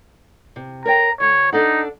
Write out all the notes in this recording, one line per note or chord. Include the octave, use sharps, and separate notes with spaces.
C3
A#4 C#5 G5 A#5
D2 C#5
D4 D#4 A4 F#5